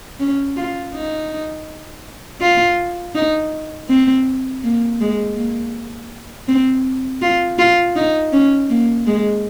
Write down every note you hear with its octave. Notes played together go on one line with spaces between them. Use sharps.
C#4
F4
D#4
F4
D#4
C4
A#3
G#3
A#3
C4
F4
F4
D#4
C#4
A#3
G#3